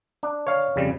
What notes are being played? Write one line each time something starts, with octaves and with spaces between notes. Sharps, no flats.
D4
C#5 F5
F2 C#3 G3